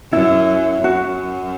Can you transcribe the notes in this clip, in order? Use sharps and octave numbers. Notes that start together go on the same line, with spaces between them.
F#2 E4
F#2 F#4